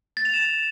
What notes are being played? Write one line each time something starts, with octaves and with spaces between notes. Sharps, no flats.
A6
F7
E7